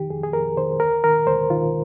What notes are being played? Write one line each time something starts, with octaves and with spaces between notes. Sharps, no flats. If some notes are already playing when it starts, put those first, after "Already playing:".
Already playing: F2 D#3 G4
F2 G#4
G#4
F2 A#4
D#3 C5
D2 A#4
D#3 A#4
D2 C5
D#3 F4